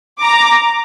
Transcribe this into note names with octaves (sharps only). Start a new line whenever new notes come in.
A#5 D6